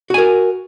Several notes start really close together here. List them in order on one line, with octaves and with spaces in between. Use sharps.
F#4 G#5 A#4